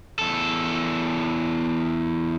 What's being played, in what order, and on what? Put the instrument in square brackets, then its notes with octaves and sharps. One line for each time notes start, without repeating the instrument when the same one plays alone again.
[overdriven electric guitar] E2 A4